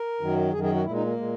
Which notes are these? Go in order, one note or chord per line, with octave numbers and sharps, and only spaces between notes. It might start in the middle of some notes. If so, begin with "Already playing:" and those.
Already playing: A#4
F#2 D#3 F#3
F#2 D#3 F#3 G#4
G#4
F#4
A#2 G#3 E4
D#4
A#3
A#2 G#3